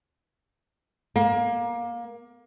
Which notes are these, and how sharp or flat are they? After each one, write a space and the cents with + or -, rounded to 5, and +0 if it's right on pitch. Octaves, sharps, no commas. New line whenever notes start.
A#3 +20